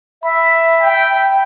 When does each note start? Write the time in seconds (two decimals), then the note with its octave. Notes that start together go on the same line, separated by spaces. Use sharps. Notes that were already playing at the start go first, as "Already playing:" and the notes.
0.23 E5 B5
0.81 G5